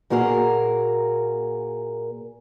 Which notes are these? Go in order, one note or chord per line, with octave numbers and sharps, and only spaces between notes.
A#2 A#3 F#4 G#4 A#4